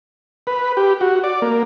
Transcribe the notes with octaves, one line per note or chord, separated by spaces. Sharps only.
B4
G4
F#4
D5
A#3